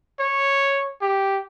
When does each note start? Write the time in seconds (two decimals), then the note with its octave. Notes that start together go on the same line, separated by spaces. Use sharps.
0.19 C#5
1.01 G4